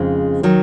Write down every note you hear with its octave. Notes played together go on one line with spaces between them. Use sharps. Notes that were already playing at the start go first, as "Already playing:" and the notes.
Already playing: F2 C#3 G#3 C4 D#4
D#3 F#3